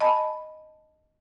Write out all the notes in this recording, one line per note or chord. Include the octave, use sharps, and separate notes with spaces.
D#5 G#5 A5 B5